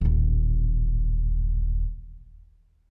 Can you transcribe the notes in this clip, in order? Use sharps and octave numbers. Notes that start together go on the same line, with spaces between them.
D#1 A1